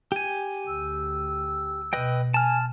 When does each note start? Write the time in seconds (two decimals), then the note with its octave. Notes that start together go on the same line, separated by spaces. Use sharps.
0.12 G4 G#5
0.68 D2 E6
1.93 B2 B4 D#5 G5
2.34 G#5 A5 F6